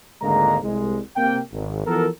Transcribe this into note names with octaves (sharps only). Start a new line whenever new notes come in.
G#1 D2 D3 G#3 A#3 A#5
C2 G#3
C3 A#3 G5
G#1
E3 F3 B3 F#4 A4 A#4